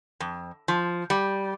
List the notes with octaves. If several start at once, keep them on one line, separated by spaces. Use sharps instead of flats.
F2
F3
G3